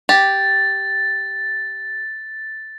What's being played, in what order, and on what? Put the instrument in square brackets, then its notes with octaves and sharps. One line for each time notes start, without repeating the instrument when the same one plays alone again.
[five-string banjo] G4 [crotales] A6